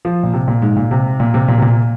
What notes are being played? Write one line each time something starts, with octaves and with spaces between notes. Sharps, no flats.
F3
A#2
C3
A#2
G#2
A#2
C3
A#2
C3
A#2
C3
A#2